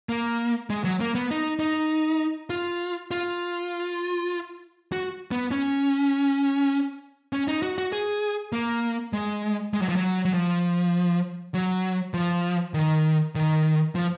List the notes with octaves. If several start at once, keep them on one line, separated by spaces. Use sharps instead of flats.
A#3
G#3
F#3
A#3
B3
D#4
D#4
F4
F4
F#4
B3
C#4
C#4
D#4
F#4
F#4
G#4
A#3
G#3
G#3
F#3
F3
F#3
F#3
F3
F#3
F3
D#3
D#3
F3